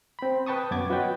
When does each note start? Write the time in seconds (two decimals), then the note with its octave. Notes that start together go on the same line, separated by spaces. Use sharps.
0.19 C4 B5
0.46 B4 G5 A5 C#6 D#6
0.71 F#2 B3 D6 G#6 A6
0.90 F4 F#4 B4 C#5 D#5 G5